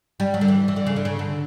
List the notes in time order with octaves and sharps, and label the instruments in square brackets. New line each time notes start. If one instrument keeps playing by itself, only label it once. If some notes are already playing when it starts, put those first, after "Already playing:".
[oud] G3
F#3
D3
E3
E3
D3
C#3
D3
C#3
D3